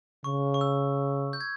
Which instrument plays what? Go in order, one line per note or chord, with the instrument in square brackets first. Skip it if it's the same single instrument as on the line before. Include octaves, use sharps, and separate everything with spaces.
[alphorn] C#3 [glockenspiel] C#6
[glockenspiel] C#6
E6
G6
G#6